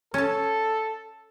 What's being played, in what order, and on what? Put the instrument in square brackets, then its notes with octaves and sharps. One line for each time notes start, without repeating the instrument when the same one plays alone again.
[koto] C#4 A5 [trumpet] A4